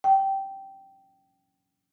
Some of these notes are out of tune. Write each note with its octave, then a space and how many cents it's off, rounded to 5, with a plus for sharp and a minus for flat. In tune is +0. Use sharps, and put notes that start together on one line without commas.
G5 -10